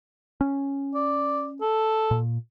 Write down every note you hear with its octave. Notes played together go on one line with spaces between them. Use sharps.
C#4
D5
A4
A#2